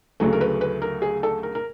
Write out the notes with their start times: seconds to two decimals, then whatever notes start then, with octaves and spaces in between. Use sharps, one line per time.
0.20 D2 C#3 F#3 A3
0.33 A#4
0.41 B4
0.61 B4
0.82 A#4
1.02 G#4
1.23 A4
1.43 A#4
1.55 A#4